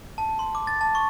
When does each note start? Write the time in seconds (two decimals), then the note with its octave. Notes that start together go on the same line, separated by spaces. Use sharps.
0.18 A5
0.39 C6
0.55 D6
0.67 A6
0.81 A5
0.95 C#6